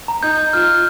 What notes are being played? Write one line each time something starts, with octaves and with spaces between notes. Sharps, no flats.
A#5
D#4 G6
F4 F6